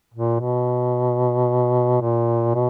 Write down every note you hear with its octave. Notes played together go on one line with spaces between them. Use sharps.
A#2
B2
A#2
B2